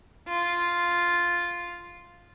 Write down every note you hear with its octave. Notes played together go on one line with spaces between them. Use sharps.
F4